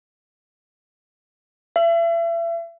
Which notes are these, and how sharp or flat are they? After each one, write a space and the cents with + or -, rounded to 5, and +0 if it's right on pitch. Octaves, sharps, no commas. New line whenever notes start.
E5 +35